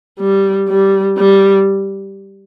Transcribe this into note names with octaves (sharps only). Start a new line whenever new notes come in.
G3
G3
G3